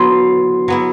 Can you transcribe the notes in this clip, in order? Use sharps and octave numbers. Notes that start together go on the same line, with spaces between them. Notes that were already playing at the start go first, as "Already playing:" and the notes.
Already playing: F#3 B3 E4 C6
F#3 B3 E4